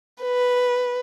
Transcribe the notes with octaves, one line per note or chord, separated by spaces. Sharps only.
B4